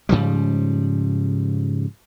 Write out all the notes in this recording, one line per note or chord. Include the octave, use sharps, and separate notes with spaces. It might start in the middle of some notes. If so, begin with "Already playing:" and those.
G#2 C#3 F3 G3